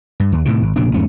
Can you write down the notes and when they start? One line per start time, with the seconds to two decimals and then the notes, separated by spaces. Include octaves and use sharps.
0.20 G2
0.32 D#2
0.45 A2 C3 D#3
0.62 G#1
0.76 F1 A#2 C#3 D4
0.94 E2 G#2 A3 C#4